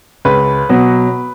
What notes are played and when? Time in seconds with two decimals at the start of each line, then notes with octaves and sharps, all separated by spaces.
0.25 C#2 B4
0.69 B2 F#3